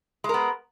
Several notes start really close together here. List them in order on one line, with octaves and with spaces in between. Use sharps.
G#3 A#4 B3